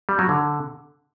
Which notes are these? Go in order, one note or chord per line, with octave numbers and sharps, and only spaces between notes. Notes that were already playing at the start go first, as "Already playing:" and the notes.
G3
F#3
D3